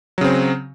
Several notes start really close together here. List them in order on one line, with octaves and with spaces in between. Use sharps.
F#3 C#3 C4